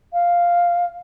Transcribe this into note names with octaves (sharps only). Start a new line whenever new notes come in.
F5